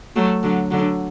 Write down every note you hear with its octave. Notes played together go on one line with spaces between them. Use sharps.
F#3 A3
D3 F#3
D3 F#3